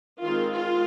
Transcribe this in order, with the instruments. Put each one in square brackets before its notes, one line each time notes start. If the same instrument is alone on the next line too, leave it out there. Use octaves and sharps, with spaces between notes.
[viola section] D#3 G#3 C4 F4
F4